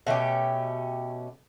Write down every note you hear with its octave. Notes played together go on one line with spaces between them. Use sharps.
B2 A3 C#4 G4